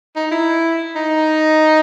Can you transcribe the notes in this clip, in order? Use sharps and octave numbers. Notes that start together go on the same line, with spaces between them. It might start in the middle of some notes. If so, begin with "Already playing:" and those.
D#4
E4
D#4